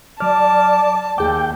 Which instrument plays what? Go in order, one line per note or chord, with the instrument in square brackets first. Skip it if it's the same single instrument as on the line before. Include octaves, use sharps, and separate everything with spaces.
[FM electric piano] F#3 F6 [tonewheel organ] D5 [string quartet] A5
[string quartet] D#2 [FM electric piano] G#4 D6 [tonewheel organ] G5